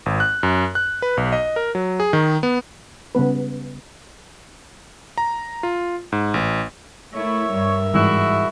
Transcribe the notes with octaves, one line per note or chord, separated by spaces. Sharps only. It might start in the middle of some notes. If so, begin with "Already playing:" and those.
G#1
F#6
F#2
F#6
B4
B1
D#5
A#4
F#3
G#4
D#3
B3
C#3 G3 B3 B4
A#5
F4
G#2
A1
A3 E4 A#4 C#5 E5
G2 G3
G#2 E3 G3 G#3 E4 F#4